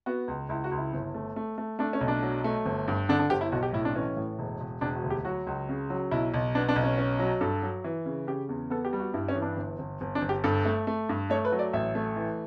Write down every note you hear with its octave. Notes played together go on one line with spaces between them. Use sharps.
B3 F#4
C#2
C#2 E4
F#4
C#2
E4
G1
A3
A3
A3
A3 D4
C#4
B1
D4
F#3
A3
G1
G2
D3 D4
D4
G1 G4
E4
B1 F#4
G4
A2 E4
D4
E3 C#4
A2
E1
E1
E1 D4
F#4
D2
G4
F#3 F#4
C#2
C#3
F#3
B1 E4
B1
B3 D4
D4
B1
C#4
C#4
F#3
G2 A4
F#3
E3
C#3
C#3 G4
E2
B3 A4
G4
G3
F#4
G2 E4
C#4
E3
D4
G1
G1
G1
D4
G1
G4
G2 A4
A3
A3
G2
A3 C#5
B4
F#3
D5
A1 E5
A3
E3